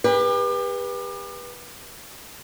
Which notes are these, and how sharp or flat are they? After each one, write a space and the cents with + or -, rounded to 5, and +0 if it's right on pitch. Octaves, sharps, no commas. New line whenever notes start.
G4 +35 B4 -25